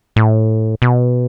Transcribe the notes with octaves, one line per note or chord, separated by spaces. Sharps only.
A2
B2